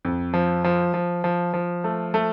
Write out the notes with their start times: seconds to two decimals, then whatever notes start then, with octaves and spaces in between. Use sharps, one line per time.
0.05 F2
0.33 F3
0.64 F3
0.94 F3
1.24 F3
1.53 F3
1.84 A3
2.14 A3